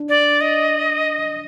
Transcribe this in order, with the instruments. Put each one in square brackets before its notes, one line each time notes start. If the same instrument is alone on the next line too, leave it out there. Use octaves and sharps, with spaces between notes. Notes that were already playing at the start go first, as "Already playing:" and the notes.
Already playing: [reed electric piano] D4
[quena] D5
D#5